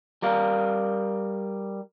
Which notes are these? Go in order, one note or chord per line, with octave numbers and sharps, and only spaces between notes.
G3 A#4 F5